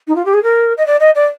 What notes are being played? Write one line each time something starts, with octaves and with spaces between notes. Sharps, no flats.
D#4
F4
G4
G#4
A#4
D#5
D5
D#5
D5